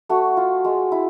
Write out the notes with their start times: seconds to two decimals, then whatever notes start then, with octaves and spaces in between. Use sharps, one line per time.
0.09 A3 F#4
0.37 F4
0.64 G#3
0.92 E4